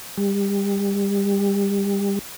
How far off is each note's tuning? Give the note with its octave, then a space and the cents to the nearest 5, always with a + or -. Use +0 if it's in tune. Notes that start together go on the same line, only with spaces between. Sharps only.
G3 +30